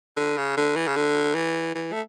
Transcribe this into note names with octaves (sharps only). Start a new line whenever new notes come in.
D3
C#3
D3
E3
C#3
D3
E3
E3
A3